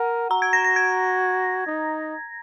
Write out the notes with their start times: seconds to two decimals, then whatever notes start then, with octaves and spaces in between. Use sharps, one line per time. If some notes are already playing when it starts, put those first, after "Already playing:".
Already playing: A#4 F#5
0.30 F#4 A#5
0.42 G#6
0.53 A#6
0.64 A#6
0.76 G#6
1.67 D#4